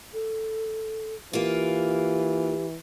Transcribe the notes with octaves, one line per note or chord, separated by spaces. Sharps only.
A4
E3 A#3 F4 G4